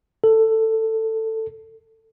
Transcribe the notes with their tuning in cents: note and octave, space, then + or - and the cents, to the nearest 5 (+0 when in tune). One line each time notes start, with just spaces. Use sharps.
A4 +15